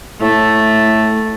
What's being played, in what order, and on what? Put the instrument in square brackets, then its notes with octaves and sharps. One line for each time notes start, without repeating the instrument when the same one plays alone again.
[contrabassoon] A2 [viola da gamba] A3